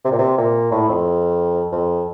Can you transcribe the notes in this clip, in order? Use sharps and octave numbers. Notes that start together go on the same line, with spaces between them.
C3
A#2
C3
A#2
A2
F2
F2